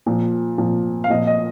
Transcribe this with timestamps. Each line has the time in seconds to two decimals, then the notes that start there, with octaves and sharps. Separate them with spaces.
0.06 A#2 F3
0.58 A#2 F3
1.04 F5
1.10 A#2 F3 D#5
1.27 D#5